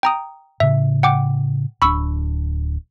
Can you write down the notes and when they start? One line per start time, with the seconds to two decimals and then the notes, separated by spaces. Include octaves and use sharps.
0.03 G5 A#5 D#6
0.60 A2 C#3 E5
1.03 F#5 G5 D6
1.82 D1 D4 B5 C#6 E6